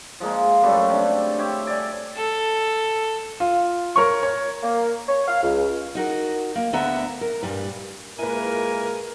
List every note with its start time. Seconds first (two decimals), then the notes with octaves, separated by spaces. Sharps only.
0.20 F3 G#3 A#3
0.62 F#2 G3 A3 A4
0.89 C3 D4
1.39 G4 C#5 E5
1.67 D5 G#5
2.16 A4
3.40 F4
3.96 A#4 C#5 C#6
4.23 C#5
4.63 A#3
5.09 C#5
5.28 F5
5.43 C#2
5.95 D#4 F#4 A#4
6.55 A#3
6.73 D2 D3 B3 E5 F#5 A#5
7.21 A#4
7.43 G2 A#2 G3 B4
8.19 A#2 G#3 A#3 E4 A#4 B4 G#5